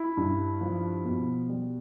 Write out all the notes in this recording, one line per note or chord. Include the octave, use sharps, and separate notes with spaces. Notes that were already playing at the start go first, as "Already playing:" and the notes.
Already playing: E4
G2
F3
B2
G3